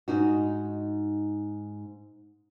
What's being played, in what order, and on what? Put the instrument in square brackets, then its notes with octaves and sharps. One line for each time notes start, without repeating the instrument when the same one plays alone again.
[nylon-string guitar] G#2 D#4 F#4